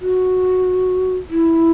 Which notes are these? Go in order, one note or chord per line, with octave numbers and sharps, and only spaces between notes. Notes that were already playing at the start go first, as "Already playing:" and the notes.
F#4
E4